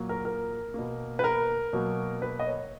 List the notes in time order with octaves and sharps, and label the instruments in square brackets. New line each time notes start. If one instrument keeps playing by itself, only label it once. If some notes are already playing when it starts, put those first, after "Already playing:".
Already playing: [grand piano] A#2 F#3 A#3
A#4
A#4
B2 A#3
B4
A#4
B2 F#3 A#3
B4
D#5
C#5